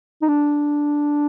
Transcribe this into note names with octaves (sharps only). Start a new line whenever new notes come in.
D#4
D4